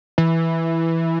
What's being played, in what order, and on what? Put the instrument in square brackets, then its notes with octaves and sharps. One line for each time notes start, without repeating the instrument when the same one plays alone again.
[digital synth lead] E3